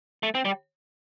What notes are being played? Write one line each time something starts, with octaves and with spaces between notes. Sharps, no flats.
A3
C4
G3